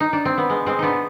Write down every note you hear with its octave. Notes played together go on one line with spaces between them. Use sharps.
D#4
D4
C4
B3
G#3
G#3 C4
B3 D4 D#4